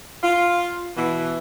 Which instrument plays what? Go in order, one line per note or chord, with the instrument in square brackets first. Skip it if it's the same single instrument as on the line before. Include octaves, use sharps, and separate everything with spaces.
[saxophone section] F4
B2 E3